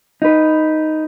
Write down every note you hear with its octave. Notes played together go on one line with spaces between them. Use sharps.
D#4 B4